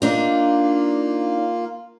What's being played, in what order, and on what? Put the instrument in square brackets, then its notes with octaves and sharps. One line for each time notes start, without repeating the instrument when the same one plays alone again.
[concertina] A#3 F4 [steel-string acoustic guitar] D4 D#4